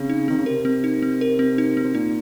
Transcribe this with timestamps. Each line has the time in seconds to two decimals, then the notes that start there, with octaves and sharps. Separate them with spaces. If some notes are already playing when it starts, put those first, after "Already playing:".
Already playing: C#3 C4
0.09 D#4
0.28 D#3 C4
0.38 C#3
0.46 C3 A#4
0.65 C4
0.84 D#4
1.02 C4
1.21 A#4
1.39 C4
1.58 D#4
1.77 C4
1.84 C3
1.95 A#2 D#4